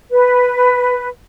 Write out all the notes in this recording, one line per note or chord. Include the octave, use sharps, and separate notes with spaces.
B4